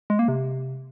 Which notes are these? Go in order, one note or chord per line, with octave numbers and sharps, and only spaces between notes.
G#3
A#3
C3